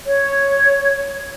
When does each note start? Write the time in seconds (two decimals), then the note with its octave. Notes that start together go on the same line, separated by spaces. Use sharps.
0.07 C#5